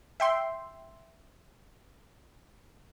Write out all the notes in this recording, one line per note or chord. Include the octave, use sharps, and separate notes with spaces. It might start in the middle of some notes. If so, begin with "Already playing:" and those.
E5 G5 C6